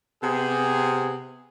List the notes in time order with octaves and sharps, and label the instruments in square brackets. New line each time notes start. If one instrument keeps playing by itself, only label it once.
[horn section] C3 B3 G#4